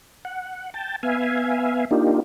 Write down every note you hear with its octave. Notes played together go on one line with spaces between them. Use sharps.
F#5
G5 A5
B3 E5 F5 G#5
A#3 D4 D#4 F4 G4